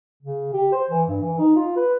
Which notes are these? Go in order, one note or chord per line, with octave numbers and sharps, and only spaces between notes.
C#3
G4
C5
E3
G2
E3
D#4
F4
B4